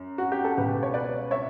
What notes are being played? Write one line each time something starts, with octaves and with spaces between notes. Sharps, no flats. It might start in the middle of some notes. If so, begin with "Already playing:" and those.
Already playing: F#2
F#4
G4
A4
C#2 B2 G4 B4
C#5
B4 D5
C#5 E5